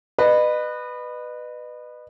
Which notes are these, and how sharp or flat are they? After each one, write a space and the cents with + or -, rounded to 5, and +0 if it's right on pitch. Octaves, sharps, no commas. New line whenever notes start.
B4 +0 D#5 -35